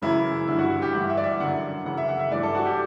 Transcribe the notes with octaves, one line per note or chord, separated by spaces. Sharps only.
F#2 C#3 E3 E4
G2 D3 E4
F#4
G4
G2 E3 F#5
E5
D5
E5
F#2 D3 F#5
F#2 C#3 E3 F#5
E5
F#5
E5
G2 E3 D5
A4
F#4
G4